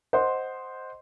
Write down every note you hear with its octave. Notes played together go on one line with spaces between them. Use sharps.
C5 D#5 F#5 C6